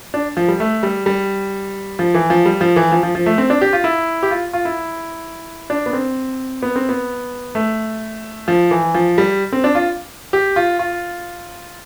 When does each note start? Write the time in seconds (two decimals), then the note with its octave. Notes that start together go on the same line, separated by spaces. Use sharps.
0.14 D4
0.37 F3
0.48 G3
0.60 A3
0.83 G3
1.06 G3
1.99 F3
2.14 E3
2.30 F3
2.46 G3
2.61 F3
2.76 E3
2.92 F3
3.03 F3
3.15 F3
3.26 A3
3.38 C4
3.50 D4
3.61 G4
3.73 F4
3.84 E4
4.23 G4
4.31 F4
4.53 F4
4.65 E4
5.70 D4
5.86 B3
5.93 C4
6.63 B3
6.76 C4
6.89 B3
7.55 A3
8.48 F3
8.71 E3
8.95 F3
9.18 G3
9.52 C4
9.64 D4
9.75 F4
10.33 G4
10.56 F4
10.79 F4